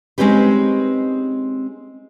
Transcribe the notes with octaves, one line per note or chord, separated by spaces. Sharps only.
G#3 C4 C#4 D#4 G4 B4